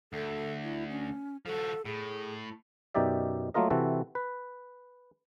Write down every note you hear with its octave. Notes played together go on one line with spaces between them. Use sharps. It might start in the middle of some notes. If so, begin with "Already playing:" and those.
D2 A4
E4
C#4
F3 F#4 A4
A2 G#4
F#2 B2 D#4 G4 D5 E5
F#3 A3 A#3 F4 A#4 D#5
C3 E3 C4 F#4 A4
B4